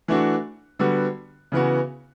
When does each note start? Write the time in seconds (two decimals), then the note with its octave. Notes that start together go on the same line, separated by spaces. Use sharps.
0.08 E3 A3 D4 F#4
0.79 D3 G3 B3 F#4
1.52 C#3 E3 B3 F#4